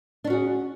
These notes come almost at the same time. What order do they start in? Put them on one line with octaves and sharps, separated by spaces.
D4 C#4 F#4 G#4